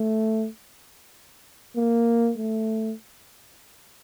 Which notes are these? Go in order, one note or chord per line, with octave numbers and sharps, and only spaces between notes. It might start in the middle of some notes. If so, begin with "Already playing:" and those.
Already playing: A3
A#3
A3